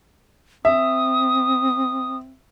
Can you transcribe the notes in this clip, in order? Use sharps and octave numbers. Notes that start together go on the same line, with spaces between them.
C4 E5 D#6